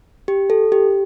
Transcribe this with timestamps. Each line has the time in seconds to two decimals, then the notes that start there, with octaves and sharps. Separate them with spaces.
0.28 G4
0.50 A4
0.72 G4